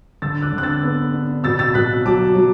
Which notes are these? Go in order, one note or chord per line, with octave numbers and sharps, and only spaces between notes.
D3 E6 A6
D6 F#6
D3
F#6
E6 A6
B3
D4
B2 E6 A6
E6 A6
B2 F#6 B6
F#3 A5 D6
F#3